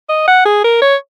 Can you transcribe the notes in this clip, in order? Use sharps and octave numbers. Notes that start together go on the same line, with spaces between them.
D#5
F#5
G#4
A#4
C#5